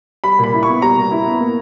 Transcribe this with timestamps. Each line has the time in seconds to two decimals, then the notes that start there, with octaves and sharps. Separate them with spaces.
0.24 G3 B5
0.39 A#2 B5
0.53 E4
0.63 B3 C#6
0.82 G3 A#5
0.97 A#2
1.11 E4
1.26 B3
1.40 A#3